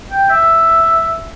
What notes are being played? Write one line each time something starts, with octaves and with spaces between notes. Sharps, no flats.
G5
E5